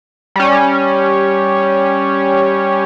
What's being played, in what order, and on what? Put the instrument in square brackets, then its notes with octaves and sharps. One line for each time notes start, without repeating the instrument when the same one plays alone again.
[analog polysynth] G3 C#4